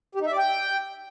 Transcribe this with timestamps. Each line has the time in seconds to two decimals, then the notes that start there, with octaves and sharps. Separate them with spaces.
0.15 G4
0.21 D#4
0.26 E5
0.32 D5
0.38 G5